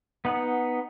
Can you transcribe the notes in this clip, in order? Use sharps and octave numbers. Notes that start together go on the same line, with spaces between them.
B3 D#4 F#5